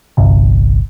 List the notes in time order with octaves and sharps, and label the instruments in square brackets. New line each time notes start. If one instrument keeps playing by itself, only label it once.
[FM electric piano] G1 C2